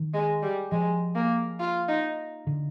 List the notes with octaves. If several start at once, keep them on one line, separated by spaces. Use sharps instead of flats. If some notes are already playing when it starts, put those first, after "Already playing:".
Already playing: D#3
G#3
G3
F3 G#3
A#3
F4
D#4
D3